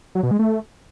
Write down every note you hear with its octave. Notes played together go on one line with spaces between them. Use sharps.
F#3
B2
G#3
A3